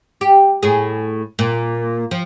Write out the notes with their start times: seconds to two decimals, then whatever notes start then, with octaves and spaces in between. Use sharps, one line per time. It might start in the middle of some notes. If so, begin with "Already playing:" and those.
0.21 G4
0.63 A2 G#4
1.39 A#2
2.11 F3